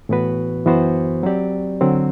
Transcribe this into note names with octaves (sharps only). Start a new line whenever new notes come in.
A2 E3 B3 F#4 B4
F#2 E3 B3 F#4 C5
F#3 C4 G4 D5
D3 F#3 C4